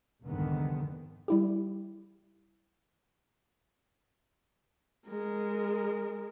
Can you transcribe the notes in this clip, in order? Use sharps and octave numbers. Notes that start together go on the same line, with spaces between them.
F1 C2 G#2 D3 D#3 B3
G3 E4 G4
G#3 A#4